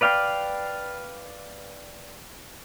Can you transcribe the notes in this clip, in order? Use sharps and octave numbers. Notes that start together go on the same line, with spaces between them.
B4 D5 F5 G5